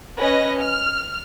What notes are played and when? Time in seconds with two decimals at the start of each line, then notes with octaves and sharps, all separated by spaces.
0.18 C#4 B4 D#5 A#6
0.60 F6